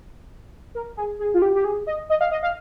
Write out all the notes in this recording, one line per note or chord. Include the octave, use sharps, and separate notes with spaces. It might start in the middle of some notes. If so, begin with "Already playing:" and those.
A#4
G#4
G#4
F4
G4
G4
G#4
D#5
D#5
F5
D#5
F5